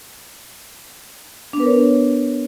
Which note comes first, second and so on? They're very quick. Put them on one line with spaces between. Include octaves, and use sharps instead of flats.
D4 B3 B4 A#4 C#5